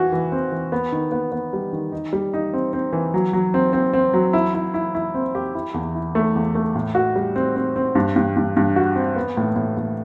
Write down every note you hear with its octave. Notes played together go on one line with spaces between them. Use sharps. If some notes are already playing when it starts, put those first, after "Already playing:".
Already playing: E3 F#4
E3
C4
E3
B3
D#3
B3
B3
G3
D#3
D#4
G3
D#4
C4
C4
E3
F#3
F#3
C4
C4
C4
F#3
E4
E4
E4
E4
C4
G4
E4
E2
E4
A3
E2
A3
A2
F#4
G3
C4
C4
C4
G2
G2
G2
G2
F#4
C4
B3
A2
A2
A2